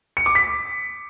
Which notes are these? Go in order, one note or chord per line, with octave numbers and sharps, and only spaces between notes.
C#7
D6
B6